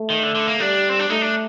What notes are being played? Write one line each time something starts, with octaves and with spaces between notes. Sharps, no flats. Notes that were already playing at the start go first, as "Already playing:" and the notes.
Already playing: A3
D#3
D3
D3
A#3
G3 D4
C4
D4
A3 D#4
D4